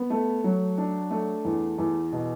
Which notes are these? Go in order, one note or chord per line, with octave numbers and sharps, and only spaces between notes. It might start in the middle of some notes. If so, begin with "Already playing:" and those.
Already playing: B3
A3
F#3
D4
A3
E2
E2
B2